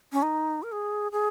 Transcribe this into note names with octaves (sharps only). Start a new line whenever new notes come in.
C#4
D#4
A#4
G#4
G#4